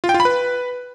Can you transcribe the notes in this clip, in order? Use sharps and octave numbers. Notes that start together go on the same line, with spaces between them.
F4
G5
F4
B5
B4